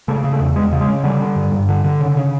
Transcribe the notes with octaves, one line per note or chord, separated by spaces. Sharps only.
C#3 A3
C#3
A3
E2
E2 G#3
C#3
G#3
C#3
D3 G3
D3
G2
G2
D3
D3
C#3
C#3